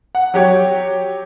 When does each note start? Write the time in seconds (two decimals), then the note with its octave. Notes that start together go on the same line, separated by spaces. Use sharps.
0.15 F#5
0.34 F#3 G4 C#5